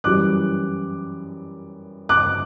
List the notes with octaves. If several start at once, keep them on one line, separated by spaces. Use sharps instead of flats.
F#2 E3 G3 D6 F#6
D6 F#6